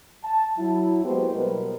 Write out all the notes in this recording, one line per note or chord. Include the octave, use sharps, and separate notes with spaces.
A5
F#3 E4
G#3 A#3 B3 F#4 G4 C5
B2 F#3 G3 A#4 B4